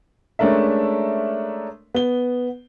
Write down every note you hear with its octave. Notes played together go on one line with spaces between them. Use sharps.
G#3 A3 C#4 D4 A#4 E5
B3 G7